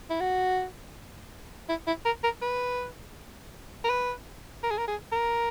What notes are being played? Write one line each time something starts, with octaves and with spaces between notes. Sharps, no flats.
E4
F#4
E4
E4
A#4
A#4
B4
A#4
B4
A#4
G#4
A#4
G#4
A#4